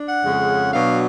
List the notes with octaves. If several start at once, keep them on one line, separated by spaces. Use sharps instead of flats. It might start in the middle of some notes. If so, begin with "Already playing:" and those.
Already playing: D4
F#5
F2 C#3 G#3 C#4
B2 F#3 B3 D4 F5